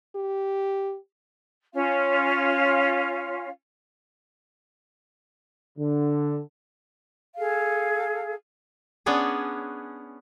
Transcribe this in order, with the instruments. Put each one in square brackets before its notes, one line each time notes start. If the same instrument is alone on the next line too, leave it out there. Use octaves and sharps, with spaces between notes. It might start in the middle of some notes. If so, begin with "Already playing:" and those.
[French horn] G4
[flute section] C#4 F4 F5
[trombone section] D3
[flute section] G#4 A4 F5
[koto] B3 C#4 D4 G#4